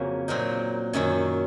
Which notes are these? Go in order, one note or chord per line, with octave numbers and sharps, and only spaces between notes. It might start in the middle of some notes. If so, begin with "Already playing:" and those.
Already playing: F2 C#3 F#3 A#3 C#4
A#2 F#3 C4 D#4 A#4
F#2 D#3 F#3 C#4